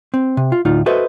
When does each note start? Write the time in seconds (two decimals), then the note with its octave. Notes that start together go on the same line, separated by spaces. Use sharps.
0.14 C4
0.37 C3
0.52 F4
0.65 D2 A2 D#4 F4
0.86 F#4 A4 B4 C5 D#5 E5